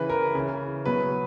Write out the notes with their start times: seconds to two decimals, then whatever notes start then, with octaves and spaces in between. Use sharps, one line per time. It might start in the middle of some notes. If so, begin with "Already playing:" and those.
Already playing: C#3 E3 B4
0.10 A#4
0.35 C#3 E3
0.85 B2 F#3 B4